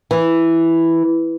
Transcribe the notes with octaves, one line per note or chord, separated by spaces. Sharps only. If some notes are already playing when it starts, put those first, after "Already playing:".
E3